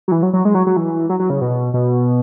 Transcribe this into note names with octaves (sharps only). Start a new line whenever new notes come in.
F#3
E3
F#3
F#3
G#3
F#3
F#3
E3
F#3
F#3
C#3
B2
B2